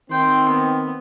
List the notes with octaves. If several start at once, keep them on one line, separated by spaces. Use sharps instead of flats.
D#3 C4 G5 C6
B3